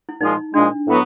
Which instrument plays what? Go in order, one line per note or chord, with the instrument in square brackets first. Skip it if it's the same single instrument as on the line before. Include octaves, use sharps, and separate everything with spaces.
[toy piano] E4
[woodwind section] A#2 F3 G#3 [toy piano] D#4
[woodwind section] A#2 F3 G#3 [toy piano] D4
[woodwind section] A2 F#3 B3